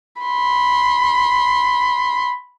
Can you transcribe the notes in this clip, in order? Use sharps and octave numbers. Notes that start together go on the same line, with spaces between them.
B5 C6